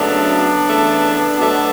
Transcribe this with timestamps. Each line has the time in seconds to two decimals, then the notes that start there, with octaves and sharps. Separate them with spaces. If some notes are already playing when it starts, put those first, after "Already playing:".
Already playing: F#2 C#3 F#3 A3 B3 D4
0.64 C#3 E3 A3
1.37 B2 F#3 A3